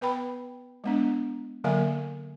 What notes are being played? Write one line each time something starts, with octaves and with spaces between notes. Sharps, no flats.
B3 B4 G5 B5
G#3 B3 D4
D3 F#3 A#3 A#4 E5 G#5